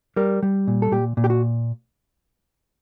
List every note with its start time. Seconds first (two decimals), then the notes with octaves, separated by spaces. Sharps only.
0.16 G3 A#4
0.43 G3
0.67 A#2
0.82 A4
0.92 A#2 G4
1.17 A#2
1.24 G4
1.30 F#4